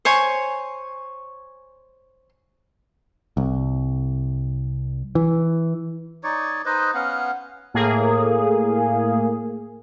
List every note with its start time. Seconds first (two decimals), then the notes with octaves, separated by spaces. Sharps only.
0.05 C5 C#5 G#5 C#6
3.37 C2
5.15 E3
6.24 D#4 C#5 D5
6.66 D#4 B4 C5 D#5
6.94 B3 C#4 F5 F#5
7.74 A2 A#3 G#4